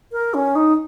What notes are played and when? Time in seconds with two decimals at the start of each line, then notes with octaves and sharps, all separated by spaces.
0.12 A#4
0.34 C#4
0.55 D#4